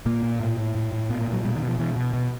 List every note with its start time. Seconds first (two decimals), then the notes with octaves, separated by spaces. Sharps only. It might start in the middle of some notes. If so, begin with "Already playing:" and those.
0.06 A#2 A#3
0.23 A#2
0.40 A2
0.58 A2
0.75 A2
0.92 A2
1.10 A#2 B3
1.21 A#3
1.27 A#2
1.33 F#3
1.44 B2 G3
1.56 D#3
1.62 B2
1.67 F3
1.79 B2 E3
1.96 B2
2.13 B2